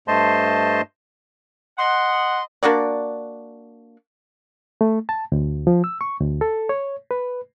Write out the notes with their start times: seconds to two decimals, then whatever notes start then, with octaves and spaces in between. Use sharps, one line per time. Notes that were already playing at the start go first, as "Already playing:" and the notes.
0.08 G2 A3 C5 D#5 A5 C6
1.78 D#5 F#5 C6
2.63 A#3 D4 F#4 D5
4.81 A3
5.09 A5
5.32 D2
5.67 F3
5.84 E6
6.01 C#6
6.20 D2
6.41 A4
6.69 C#5
7.11 B4